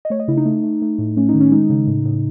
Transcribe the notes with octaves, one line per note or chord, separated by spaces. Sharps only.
D#5
A3 C#5
D#5
C#3 E4
D#4
A3
A3
A3
A2
A3 C#4
D#4
D#3
C#4
G#3 D#4
C#3
A2
A2